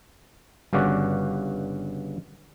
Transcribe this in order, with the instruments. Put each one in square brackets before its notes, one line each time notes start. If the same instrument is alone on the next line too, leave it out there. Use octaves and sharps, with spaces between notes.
[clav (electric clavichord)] G1 G2 C#3 F#4 D5